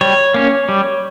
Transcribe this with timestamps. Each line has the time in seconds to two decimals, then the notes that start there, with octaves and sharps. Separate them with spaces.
0.01 G3 C#5
0.34 A#3 C#4
0.69 G3